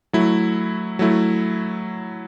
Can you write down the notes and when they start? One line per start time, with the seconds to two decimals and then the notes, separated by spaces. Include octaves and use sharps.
0.13 F#3 A3 E4
0.99 F#3 A3 E4